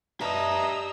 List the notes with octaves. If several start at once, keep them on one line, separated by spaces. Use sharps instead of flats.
D4 G4 B4 D#5 E5 A5 A#5 E6